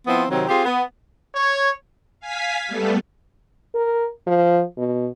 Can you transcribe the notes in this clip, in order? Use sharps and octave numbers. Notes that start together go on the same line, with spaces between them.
F3 B3 C4 E4
C3 D#3 F#3 C4
C4 F4 G4 G#4
B3
C#5
F5 G#5 B6
G3 A3 B3 A4
A#4
F3
B2